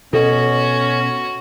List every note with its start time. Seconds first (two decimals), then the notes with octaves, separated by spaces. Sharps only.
0.13 B2 C#4 F#4 A4